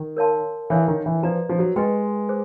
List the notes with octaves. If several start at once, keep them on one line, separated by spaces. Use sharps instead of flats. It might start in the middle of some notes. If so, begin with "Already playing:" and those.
Already playing: D#3
A#4 C#5 F5 A5 C6
E3 A4 C#5 F5
D#3
E3
F3 B4 D5 F5 A#5
F3
F#3
G#3 G4 B4 D#5 G5 C6
G#4 C5